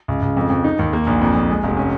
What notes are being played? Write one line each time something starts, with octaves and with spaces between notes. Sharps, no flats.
C#2
C#2
F2
F2
D#4
D#2
A#3
A#1
F2
F2
G#3
F1
C#4